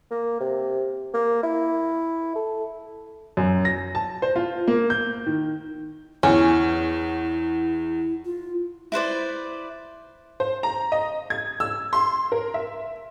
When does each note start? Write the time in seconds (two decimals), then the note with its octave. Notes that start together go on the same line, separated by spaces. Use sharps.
0.11 A#3
0.40 C3
1.13 A#3
1.43 E4
2.35 A4
3.37 F#2
3.65 A#6
3.95 A5
4.22 C5
4.36 F4
4.67 A#3
4.90 G6
5.26 D#3
6.23 E2 C#4 E4
8.25 F4
8.92 E4 B4 C5 D5
10.40 C5
10.63 A#5
10.92 D#5
11.30 G#6
11.60 E6
11.93 C6
12.32 A#4
12.54 E5